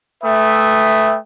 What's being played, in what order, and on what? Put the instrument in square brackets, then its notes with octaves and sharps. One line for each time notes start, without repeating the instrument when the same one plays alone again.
[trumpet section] A3 B4 E5 G5 D#6